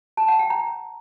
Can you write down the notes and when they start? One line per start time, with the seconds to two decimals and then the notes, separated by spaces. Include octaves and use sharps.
0.17 A5
0.28 F#5
0.39 G5
0.50 A#5